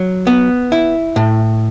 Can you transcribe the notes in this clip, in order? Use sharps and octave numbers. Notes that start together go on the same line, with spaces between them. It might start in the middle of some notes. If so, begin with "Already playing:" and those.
Already playing: F#3
B3
E4
A2